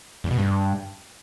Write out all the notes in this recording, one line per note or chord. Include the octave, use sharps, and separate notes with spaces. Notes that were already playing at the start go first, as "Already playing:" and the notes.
E2
B2
G2